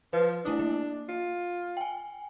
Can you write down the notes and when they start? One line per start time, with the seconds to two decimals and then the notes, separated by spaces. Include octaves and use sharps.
0.13 F3 B4
0.45 A3 D4 E4 D#6
0.59 A#3
1.09 F4
1.77 G5 G#5